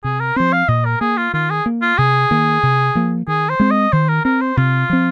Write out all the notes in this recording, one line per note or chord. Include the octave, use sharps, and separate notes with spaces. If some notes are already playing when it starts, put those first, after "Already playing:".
C3 G#4
A#4
F3 C4 C5
F5
A#2 D#5
A#4
A#3 G#4
F4
D#3 F4
G#4
A#3
F4
C3 G#4
D#3 A#3
C3
F3 A#3
D#3 G#4
C5
G#3 C4
D#5
D#3 C5
A#4
C4 A#4
C5
C3 F4
F3 C4